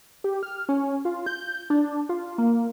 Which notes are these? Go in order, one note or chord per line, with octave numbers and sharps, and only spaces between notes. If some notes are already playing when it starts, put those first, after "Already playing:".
G4
F6
C#4
F4
G6
D4
F4
A#3